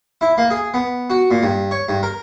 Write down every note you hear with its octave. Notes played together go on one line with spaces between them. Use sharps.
E4
A#3
G#4
B3
F#4
A#2
G2
C#5
G2
A#4